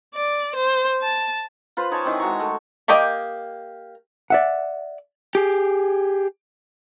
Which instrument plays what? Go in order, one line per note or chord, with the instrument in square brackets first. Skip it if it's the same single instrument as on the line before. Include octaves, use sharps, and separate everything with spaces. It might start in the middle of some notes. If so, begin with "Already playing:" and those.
[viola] D5
C5
A5
[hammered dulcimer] F4 B4 C5
D#4 C#5 G#5 A5
D#3 E3 C4
G#3 F#4 A#5 C#6
A3
[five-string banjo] A#3 G4 A#4 D#5 G5
[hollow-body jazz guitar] D5 E5 F#5
[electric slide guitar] G4 G#4